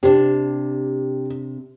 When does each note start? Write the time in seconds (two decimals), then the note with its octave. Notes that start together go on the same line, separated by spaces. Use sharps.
0.03 C3 D4 G4